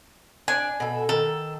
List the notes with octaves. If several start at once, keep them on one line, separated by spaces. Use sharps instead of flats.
D4 C#5 D5 G#5
B2 A4
D#3 A4